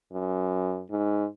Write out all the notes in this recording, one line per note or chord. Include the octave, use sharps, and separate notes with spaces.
F#2
G#2